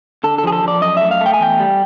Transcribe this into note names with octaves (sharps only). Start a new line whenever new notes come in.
D3 A4
A4
F3 G#4
A4
F3 D5
F#2 D#5
A3 E5
F5
A3
G5
G#5
E2 G5
G3